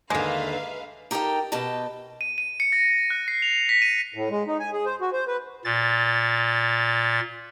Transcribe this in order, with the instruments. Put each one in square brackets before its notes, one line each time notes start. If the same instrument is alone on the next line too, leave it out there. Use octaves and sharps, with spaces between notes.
[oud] D#2 D3 [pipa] G#3 A#3 [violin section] B4 E5 F5
[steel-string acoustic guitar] D#4 G4 A4 A#4 G5
B2 G4 D#5 A5
[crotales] D#7
D#7
C#7
A#6
F#6
C7
F7
B6
D#7
[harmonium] A2
G#3
D#4
G#5
G#4
C5
F#4
C5
B4
[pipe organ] A#2 A6